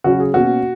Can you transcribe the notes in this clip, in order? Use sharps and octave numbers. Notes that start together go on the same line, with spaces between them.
C#3 F#3 C#4 F#4
G#4
B2 A#3 C#4 F#4